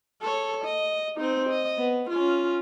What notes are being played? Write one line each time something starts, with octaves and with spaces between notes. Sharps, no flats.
A4 C#5
D#5
C4 D#4
D#5
B3
C#4 F4